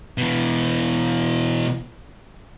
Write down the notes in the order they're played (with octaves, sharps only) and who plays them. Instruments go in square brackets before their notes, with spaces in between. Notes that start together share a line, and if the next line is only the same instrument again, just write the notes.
[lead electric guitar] B2 E3